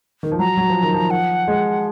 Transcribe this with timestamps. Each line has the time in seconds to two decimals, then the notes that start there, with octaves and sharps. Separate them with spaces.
0.23 D#3
0.32 F3
0.39 F#3 A#5
0.57 F#3
0.70 F3
0.83 D#3
0.94 F3
1.11 F#5
1.48 G#3